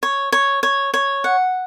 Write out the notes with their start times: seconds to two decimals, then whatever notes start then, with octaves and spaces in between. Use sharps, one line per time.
0.03 C#5
0.32 C#5
0.63 C#5
0.94 C#5
1.24 F#5